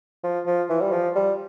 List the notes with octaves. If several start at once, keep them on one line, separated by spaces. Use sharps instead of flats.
F3
F3
E3
G3
F3
G3